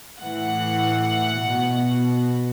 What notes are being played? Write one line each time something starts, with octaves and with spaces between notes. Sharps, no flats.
A2 E3 F#5
B2